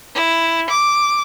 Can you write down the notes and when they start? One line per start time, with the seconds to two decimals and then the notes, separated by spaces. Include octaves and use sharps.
0.15 E4
0.70 D6